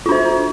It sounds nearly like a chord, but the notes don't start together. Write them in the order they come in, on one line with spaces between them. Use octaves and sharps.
F4 D4 C5